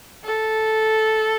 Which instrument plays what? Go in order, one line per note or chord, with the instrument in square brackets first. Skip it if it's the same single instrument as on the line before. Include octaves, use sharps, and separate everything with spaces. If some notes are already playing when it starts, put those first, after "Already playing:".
[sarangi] A4